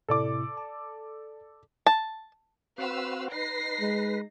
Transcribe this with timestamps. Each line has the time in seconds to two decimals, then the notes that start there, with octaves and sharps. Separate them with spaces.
0.09 A2 C3 E4 A4 D5 D6
0.57 A5
1.86 A5
2.78 C4 F#4 B4 F5 E6
3.32 D#4 B4 A#6 C7
3.81 G#3